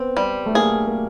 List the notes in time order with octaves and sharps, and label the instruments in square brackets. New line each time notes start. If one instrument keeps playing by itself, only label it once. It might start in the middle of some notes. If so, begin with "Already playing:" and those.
Already playing: [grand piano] B3 [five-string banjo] C4
[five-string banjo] G3
[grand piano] A3
[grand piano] A#3 [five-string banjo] G#4
[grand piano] A#3